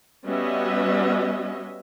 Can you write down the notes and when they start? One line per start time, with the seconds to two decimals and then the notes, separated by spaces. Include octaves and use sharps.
0.25 G3 B3 C#4 F#4 D#5 E5